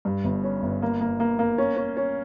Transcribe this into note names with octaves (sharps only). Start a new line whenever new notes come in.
G2
G1
C#4
G1
A#3
A#3
A#3
A#3
C#4
C#4
C#4